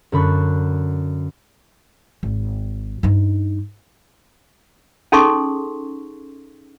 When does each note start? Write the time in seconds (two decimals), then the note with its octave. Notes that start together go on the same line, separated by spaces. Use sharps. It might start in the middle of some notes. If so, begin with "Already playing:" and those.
0.12 F#2 D3 B5 C#6 F#6
2.23 G#1
3.03 G2 D#4
5.12 C#4 D#4 G#4 A4 C6 C#6